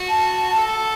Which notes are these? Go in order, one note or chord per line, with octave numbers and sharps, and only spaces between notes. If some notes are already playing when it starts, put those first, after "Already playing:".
Already playing: F#4
A5
A4